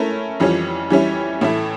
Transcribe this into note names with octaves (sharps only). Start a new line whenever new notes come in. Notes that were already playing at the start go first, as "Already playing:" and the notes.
Already playing: A3 C#4 E4 A#4
F2 E3 G3 C#4 F4
E3 G3 C#4 E4
A2 E3 A3 E4